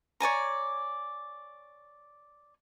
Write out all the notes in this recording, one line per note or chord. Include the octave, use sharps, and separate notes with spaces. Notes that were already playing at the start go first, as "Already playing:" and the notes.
C#5 D5 G#5 A#5